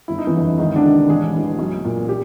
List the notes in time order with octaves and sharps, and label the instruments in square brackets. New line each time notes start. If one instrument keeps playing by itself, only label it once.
[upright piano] G1 E4
D#4
E3 E4
F2 D3
C#2 D#3 D#4
D3 D4
C3 D#3
A1 G#3 G#4
G2 E3
B1
A#2
G4